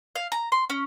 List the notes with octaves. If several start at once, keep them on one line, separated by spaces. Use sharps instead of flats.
F5
A#5
C6
C#4